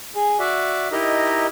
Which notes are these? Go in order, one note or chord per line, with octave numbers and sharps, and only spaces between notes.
G#4
F#4 D5 E5
D#4 E4 G4 A#4 D#5